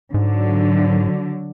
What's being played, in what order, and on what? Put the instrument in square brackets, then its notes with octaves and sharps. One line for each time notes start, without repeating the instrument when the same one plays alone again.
[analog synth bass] G#2 [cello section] D3 F#3